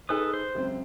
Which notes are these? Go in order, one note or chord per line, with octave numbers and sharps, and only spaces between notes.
D#4 G#4 A4 B4 D#6
C5
C#2 F#2 C4